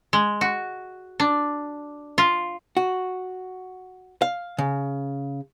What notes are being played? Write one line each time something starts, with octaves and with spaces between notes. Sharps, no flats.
G#3
F#4
D4
F4
F#4
F5
C#3